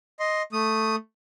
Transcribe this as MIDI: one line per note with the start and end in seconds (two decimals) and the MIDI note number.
0.19 0.42 75
0.19 0.42 84
0.53 0.96 57
0.53 0.96 87